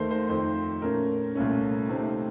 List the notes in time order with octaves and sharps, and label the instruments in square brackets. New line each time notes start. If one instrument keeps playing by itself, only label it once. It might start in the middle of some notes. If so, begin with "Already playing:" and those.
Already playing: [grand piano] D#2 D#3 A3 A#4 C5
C5
F2 D#3 A3 C5
A#2 A3 C#4 A#4
C2 A#2 A3 C#4
C3 D#3 A3 C4